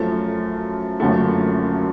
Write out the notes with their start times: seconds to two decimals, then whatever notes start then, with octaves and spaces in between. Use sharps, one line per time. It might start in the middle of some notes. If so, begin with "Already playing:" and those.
Already playing: F#2 F3 A3
1.00 F#1 F#2 D3 F3 A3